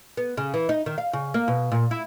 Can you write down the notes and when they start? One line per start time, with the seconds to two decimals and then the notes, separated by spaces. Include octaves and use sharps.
0.17 B3
0.37 C#3
0.54 E3
0.69 D#4
0.86 D#3
0.98 F5
1.13 C#3
1.34 A#3
1.48 B2
1.72 A#2
1.91 E4